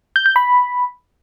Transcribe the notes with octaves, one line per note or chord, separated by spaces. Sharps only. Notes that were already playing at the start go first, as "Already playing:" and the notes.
G6
G6
B5